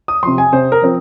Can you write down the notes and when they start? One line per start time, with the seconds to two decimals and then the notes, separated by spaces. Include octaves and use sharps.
0.08 D#6
0.23 C3 F3 C6
0.38 G#5
0.52 C3 C5
0.72 A#4
0.82 F3 C4